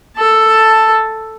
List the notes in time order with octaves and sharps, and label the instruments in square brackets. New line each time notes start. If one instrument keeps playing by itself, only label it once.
[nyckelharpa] A4 A5